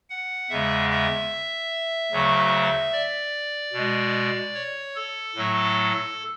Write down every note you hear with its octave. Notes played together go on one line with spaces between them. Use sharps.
F#5
E2 C#3 G#3 E5
E5
D2 C#3 F#3 A3
D5
B2 G#3
C#5
A4
A2 F#3 A3